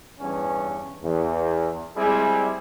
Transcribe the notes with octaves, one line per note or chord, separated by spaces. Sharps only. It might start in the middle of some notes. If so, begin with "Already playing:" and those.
E2 G2 C#4
E2
G3 G#3 C4 E4 G#4